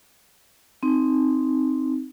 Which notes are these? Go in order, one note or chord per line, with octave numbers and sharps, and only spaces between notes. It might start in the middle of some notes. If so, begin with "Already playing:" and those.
C4 D#4